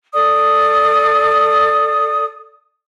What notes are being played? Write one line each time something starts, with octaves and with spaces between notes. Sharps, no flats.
A4 D5 D#6